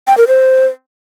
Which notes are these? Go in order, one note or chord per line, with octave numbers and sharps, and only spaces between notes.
G5
A#4
C5